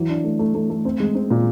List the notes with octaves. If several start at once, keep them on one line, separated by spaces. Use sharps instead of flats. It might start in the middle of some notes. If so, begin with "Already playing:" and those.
Already playing: E3 F#3
D4
A3
A3
A3
A3
C4
G#3
C4
A#2